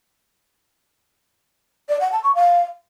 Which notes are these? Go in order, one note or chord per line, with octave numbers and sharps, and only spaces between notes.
D5
F#5
A5
C#6
F5